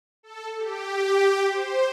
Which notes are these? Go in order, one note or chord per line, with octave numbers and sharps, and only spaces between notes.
A4
G4
C5